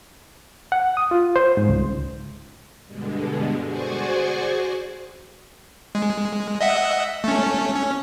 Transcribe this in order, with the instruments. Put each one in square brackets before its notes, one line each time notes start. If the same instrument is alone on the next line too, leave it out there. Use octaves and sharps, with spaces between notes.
[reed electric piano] F#5
D#6
F4
C5
G#2
C#2
[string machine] G2 B2 D3 G#3
F#4 G#4 C5 D5 G#5 C#6
[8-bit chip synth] G#3
D#5 E5 F#5
A3 C#4
C#4